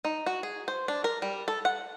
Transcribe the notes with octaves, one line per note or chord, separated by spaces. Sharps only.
D#4
F#4
G#4
C5
D4
A#4
G3
A4
F#5